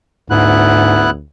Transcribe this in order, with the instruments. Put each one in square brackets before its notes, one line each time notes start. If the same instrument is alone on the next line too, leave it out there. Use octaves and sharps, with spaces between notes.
[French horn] D2 [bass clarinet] G#2 [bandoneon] B3 E4 F#6